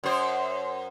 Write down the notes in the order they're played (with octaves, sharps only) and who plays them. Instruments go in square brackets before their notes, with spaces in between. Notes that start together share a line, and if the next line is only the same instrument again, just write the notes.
[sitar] F#2 C5